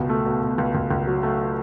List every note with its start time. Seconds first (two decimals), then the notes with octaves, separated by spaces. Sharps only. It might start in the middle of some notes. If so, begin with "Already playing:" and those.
Already playing: C#2 B2
0.09 A3
0.26 B2
0.42 B2
0.58 C#2
0.75 C#2
0.91 C#2
1.07 F#3
1.23 A3